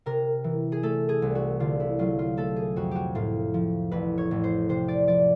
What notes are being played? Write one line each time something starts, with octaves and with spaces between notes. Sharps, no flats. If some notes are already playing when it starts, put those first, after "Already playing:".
C3 A#4
E3
G#4
A3 A4
G#4
C2
F#4
D3 F4
E4
F#3 F4
F4
A3 A4
G#4
F2 F#4
F#4 G4
A2 F4
F3
A1 B4
C#5
A1
C5
C3 C5
D5
F3 D5